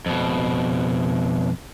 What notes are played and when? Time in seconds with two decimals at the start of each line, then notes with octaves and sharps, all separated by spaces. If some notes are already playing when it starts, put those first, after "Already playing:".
0.06 F2 B2